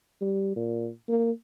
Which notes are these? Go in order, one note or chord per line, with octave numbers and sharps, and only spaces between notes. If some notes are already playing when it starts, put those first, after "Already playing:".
G3
A#2
A#3